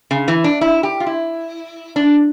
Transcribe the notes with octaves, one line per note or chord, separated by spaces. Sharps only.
C#3
E3
D4
E4
G4
F4
E4
D4